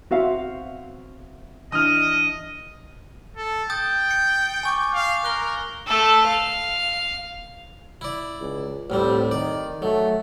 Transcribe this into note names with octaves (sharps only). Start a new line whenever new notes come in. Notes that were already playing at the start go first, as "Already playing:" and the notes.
B3 C4 F#4 C5 E5 F5
E3 D4 E4 D#5 D#6 F6
A4
G5 D#6 G6 A6
C#7
G#5 C#6 D6
F5
A#4 F#6 G7
A3 A4
F5
E4 D5
C#2
D2 A2 G3 C4
D#3 D5
F#3 A3